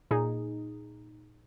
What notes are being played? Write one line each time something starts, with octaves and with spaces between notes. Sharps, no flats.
A#2 D#4 G#4